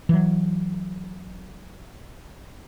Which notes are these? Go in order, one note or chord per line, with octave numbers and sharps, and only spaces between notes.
E3 F#3